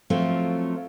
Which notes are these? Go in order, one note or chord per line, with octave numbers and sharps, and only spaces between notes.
F3 F#3 A3 C4 F4